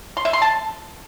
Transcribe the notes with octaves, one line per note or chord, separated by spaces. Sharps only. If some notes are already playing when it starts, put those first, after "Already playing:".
C6
E5
C6
A5